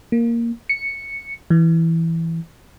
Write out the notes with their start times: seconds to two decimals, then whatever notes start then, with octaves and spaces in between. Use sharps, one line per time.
0.12 A#3
0.69 C#7
1.50 E3